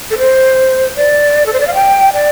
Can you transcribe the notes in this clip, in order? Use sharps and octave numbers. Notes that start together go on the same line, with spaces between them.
A4
C5
D5
A4
C5
D5
F5
G5
D5